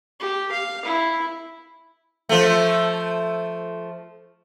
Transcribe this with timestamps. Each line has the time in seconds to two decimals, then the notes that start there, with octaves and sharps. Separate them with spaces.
0.20 G4
0.52 F5
0.85 E4
2.29 F3 A3